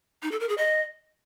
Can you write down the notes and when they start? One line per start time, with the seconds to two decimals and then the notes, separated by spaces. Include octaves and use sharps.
0.23 D#4
0.31 A4
0.40 A#4
0.49 G#4
0.58 D#5